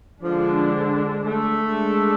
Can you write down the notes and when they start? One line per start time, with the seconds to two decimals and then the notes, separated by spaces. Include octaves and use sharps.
0.22 D3 F3 G#3 D4
1.24 A3
1.58 G#3 D4 A4